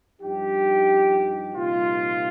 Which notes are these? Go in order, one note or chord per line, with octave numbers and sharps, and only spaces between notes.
G2 F3 D#4 G4
C2 A#2 F3 D#4 F4